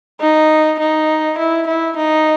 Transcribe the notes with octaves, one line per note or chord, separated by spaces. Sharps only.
D#4
D#4
E4
E4
D#4